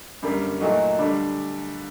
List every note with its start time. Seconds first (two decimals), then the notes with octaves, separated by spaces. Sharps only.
0.22 F#2 D3 G3 A#3
0.61 A#2 F#3 A3 D#4 F#4
0.98 D3 G3 D4